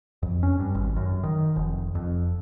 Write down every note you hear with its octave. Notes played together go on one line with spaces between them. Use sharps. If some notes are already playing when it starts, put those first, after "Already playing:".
F2
C#4
G2
G#1
F#2
D#3
F1
F2